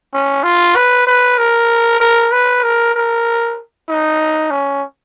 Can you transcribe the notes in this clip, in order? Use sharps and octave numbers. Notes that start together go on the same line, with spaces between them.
C#4
F4
B4
B4
A#4
A#4
B4
A#4
A#4
D#4
C#4